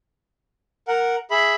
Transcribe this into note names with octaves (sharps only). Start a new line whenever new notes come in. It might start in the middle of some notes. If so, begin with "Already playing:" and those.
A#4 F#5
G#4 E5 B5